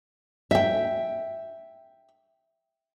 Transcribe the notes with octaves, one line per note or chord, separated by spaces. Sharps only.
E5 G5